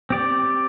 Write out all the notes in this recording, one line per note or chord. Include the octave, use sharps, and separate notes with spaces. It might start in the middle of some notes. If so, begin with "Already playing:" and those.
C4 G4 D5